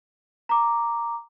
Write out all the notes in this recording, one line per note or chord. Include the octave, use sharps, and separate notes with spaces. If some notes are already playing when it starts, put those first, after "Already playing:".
A#5 D6